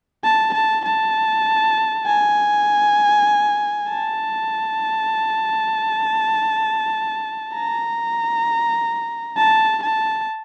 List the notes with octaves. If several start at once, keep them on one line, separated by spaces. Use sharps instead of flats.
A5
A5
A5
G#5
A5
A#5
A5
A5